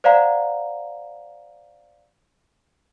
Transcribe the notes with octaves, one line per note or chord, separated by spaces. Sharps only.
C5 D5 F5 F#5 A#5